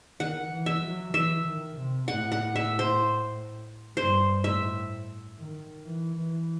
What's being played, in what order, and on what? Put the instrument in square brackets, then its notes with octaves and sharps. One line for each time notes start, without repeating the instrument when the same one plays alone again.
[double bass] D#3 [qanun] F#5
[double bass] E3
[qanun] E5
[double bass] F#3
[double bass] E3 [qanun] E5
[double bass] D#3
C3
[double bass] A2 [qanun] F#5
[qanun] F#5
E5
C5
[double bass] G2 [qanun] C5
[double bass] A2 [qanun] E5
[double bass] D#3
E3
E3